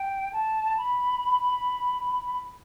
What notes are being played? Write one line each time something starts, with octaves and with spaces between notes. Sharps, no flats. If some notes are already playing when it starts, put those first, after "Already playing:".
Already playing: G5
A5
B5